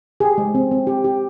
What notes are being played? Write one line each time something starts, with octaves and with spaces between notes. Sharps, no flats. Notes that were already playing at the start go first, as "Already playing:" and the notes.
G4 G#4
G#3
C4
C4
G4
G4